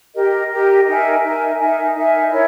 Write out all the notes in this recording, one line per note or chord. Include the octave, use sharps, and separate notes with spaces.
G4 A#4 D#5
G4 A#4 D#5
D#4 A#4 E5 G#5
D#4 A#4 E5 G#5
D#4 A#4 E5 G#5
D#4 A#4 E5 G#5
E4 A#4 C#5